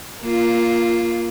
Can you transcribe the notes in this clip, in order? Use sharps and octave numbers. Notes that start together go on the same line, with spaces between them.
A#3 F4